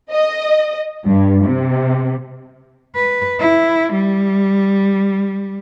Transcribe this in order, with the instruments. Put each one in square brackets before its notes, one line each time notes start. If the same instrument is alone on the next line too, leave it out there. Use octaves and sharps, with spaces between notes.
[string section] D#5
G2
C3
[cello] B4
E4
G3